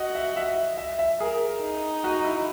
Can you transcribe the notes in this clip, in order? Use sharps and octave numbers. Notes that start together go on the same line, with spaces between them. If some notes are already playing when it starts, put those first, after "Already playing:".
Already playing: F#4 D#5
E5
E5
E5
E5
G#4 A#4
D#4
F#4
E4